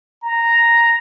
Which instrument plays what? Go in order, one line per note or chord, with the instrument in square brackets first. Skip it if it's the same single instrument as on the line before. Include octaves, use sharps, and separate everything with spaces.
[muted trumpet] A#5